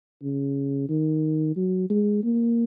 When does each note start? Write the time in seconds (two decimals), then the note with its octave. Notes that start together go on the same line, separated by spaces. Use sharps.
0.23 C#3
0.89 D#3
1.56 F#3
1.90 G#3
2.24 A#3